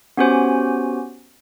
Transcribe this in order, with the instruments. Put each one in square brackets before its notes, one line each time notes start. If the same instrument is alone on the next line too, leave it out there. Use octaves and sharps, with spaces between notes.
[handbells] B3 C#4 F#4 G4 C5 G#5